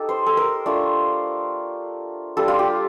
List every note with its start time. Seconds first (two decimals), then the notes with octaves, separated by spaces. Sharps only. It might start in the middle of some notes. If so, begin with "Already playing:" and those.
Already playing: D#4 G4 A4
0.09 C5
0.26 A4
0.37 A#4
0.66 A3 D4 F4
2.37 G3 D4 F4 A4
2.48 F4
2.59 G4